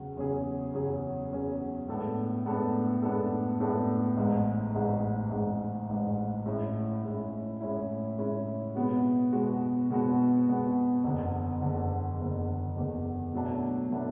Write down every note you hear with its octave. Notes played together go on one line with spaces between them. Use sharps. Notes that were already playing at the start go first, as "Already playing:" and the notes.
Already playing: E2 C#3 F#3
E2 C#3 F#3 C#4 G#4
E2 C#3 F#3 C#4 G#4
E2 C#3 F#3 C#4 G#4
A2 G#3 B3 D4 A4
A2 G#3 B3 D4 A4
A2 G#3 B3 D4 A4
A2 G#3 B3 D4 A4
A1 G#2 G#3
A1 G#2 G#3
A1 G#2 G#3
A1 G#2 G#3
A2 G#3 C#4 E4
A2 G#3 C#4 E4
A2 G#3 C#4 E4
A2 G#3 C#4 E4
B2 G#3 B3 F#4
B2 G#3 B3 F#4
B2 G#3 B3 F#4
B2 G#3 B3 F#4
F#1 E2 D3
F#1 E2 D3
F#1 E2 D3
F#1 E2 D3
B2 F#3 A3 D4
B2 F#3 A3 D4